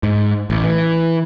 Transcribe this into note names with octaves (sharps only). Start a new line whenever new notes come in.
G#2
A1
E3